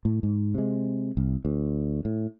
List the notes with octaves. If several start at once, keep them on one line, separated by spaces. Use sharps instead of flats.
A2
G#2
C3 G#3
C2
D2
A2